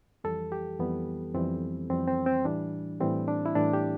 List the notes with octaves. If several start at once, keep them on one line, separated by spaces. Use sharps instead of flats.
F2 E3 G3 A4
G4
F2 E3 G3 B3
F2 E3 G3 C4
F2 E3 G3 C4
C4
C4
A2 E3 G3 D4
A2 E3 G3 C4
D4
E4
A2 E3 G3 D4
G4